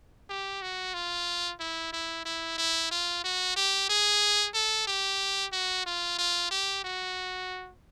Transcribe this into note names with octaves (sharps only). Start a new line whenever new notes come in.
G4
F#4
F4
E4
E4
E4
E4
F4
F#4
G4
G#4
A4
G4
F#4
F4
F4
G4
F#4